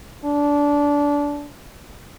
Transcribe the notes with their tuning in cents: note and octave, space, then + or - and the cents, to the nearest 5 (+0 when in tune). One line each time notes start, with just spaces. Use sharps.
D4 -20